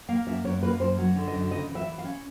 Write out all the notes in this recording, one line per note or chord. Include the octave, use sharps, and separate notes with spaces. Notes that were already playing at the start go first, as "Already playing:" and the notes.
A#3 F5
F#2 E5
F#2 C#5
A#3 B4
F#2 C5
F#3
D3
D#5
F#2
C#3 D#5
E3
E5
E3
F5
C#4